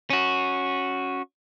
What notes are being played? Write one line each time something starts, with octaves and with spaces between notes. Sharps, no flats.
C#4 F#4